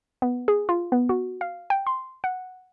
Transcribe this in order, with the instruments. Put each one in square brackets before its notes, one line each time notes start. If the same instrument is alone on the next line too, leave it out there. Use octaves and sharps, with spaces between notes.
[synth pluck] B3
G#4
F4
B3
F#4
F5
G5
C6
F#5